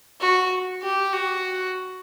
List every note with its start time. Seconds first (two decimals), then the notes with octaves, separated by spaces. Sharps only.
0.21 F#4
0.82 G4
1.13 F#4